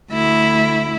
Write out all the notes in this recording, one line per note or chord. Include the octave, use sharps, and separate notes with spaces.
D2 E4